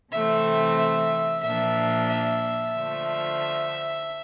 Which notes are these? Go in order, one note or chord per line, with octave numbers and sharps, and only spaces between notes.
C3 E3 A3 C4 E5
E5
A#2 F3 A#3 D4 E5
E5
D3 F3 A3